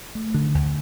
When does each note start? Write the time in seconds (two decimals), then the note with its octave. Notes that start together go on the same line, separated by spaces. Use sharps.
0.15 A3
0.34 D3
0.55 D2